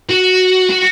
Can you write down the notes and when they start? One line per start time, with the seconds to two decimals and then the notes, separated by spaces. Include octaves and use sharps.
0.10 F#4
0.69 F#4